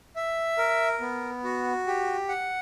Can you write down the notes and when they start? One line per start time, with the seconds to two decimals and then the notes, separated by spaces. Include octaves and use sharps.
0.16 E5
0.58 A#4
1.01 B3
1.44 F#4
1.87 G4
2.29 F#5